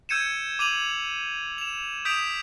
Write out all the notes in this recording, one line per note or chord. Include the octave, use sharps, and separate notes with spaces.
E6 G6 G#6 C#7 D#7 E7
D6 D#7 F7 F#7
E7 F7
D#6 G6 B6 D7 E7 F7